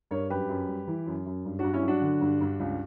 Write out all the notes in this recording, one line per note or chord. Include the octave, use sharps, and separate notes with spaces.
G2 A#4 C#5
F#2 G4 B4
F#2
G3
E3
F#2
F#2
G2
G2 D4 F#4
C#4 E4
F#3 D4 F#4
D3
G2
G2
C#2